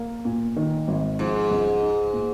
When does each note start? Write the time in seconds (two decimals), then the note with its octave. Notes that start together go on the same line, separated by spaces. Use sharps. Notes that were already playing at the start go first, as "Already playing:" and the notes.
Already playing: A#3
0.25 A#2
0.56 D#3
0.88 G#1
1.19 G#2 F3
1.51 C#2
1.83 D#4
2.13 A#2